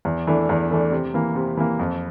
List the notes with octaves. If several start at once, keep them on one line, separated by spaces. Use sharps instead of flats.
E2
E3 A3 D4
E2
E3 A3 D4
C3
E3 A#3
C3
E3 A#3
F2